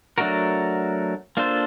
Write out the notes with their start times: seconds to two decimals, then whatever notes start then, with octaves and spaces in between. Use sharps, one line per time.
0.18 F#3 A3 D4 F#4 A#4
1.37 A#3 D4 F4 A4 C5